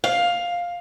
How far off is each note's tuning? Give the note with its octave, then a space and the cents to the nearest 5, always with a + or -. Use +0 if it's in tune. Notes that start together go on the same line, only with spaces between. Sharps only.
F5 +10